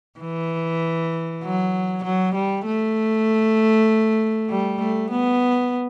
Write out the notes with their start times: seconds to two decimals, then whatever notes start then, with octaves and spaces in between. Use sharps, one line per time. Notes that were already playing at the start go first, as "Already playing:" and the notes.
0.20 E3
1.44 F#3
2.04 F#3
2.35 G3
2.66 A3
4.50 G3
4.80 A3
5.11 B3